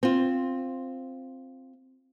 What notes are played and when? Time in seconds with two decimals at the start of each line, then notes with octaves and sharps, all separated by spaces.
0.03 C4 F4